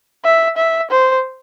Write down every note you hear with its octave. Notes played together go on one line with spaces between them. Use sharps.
E5
E5
C5